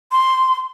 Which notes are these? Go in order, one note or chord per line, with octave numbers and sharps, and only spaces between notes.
C6